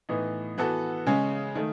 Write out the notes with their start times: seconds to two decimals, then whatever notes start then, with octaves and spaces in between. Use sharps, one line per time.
0.09 A2 E3 B3 D#4
0.58 E3 B3 F#4 A4
1.06 C#3 G#3 C#4
1.55 D#3 A3